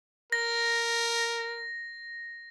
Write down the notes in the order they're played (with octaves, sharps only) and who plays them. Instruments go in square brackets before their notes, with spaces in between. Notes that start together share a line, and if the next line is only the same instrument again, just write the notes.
[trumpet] A#4 [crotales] A#6